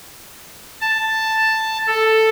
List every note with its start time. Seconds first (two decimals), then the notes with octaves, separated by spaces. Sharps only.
0.81 A5
1.86 A4